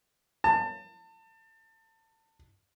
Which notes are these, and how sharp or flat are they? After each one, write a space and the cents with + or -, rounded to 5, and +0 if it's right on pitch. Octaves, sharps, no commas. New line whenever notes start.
A5 +30